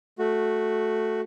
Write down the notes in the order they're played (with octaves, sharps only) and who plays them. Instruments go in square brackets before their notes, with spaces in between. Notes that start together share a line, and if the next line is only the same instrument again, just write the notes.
[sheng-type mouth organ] A3 F#4